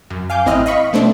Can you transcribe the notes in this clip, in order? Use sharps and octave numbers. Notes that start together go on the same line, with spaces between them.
F#2
F5 G#5 D6 G6
A1 C4 E4 D#5 F6 F#6
D#5 F5 B5 C#6
B2 A3 C4 D4